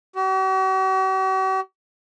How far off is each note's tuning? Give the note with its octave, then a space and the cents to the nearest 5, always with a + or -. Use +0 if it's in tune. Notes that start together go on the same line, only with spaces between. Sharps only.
F#4 +45